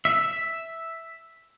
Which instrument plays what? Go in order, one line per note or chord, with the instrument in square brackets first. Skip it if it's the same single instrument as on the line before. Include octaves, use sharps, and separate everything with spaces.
[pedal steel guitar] E5